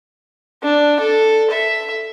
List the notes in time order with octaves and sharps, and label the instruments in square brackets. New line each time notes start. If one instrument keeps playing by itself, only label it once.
[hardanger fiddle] D4
A4
E5